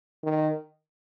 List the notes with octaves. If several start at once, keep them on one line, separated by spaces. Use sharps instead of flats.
D#3